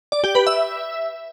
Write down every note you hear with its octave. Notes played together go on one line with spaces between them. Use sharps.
D5
G4
B4
E5